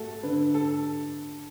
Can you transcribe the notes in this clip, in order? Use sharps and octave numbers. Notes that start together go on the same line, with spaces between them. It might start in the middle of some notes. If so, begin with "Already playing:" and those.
Already playing: A3 F#4 A4
D3 B4
A4